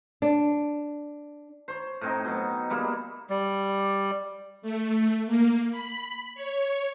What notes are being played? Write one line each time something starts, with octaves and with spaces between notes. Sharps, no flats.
D4
C5 C#5
A2 C4 D#4
B2 F#3
G3 G#3 A#3 E4
G3
A3
A#3
B5
C#5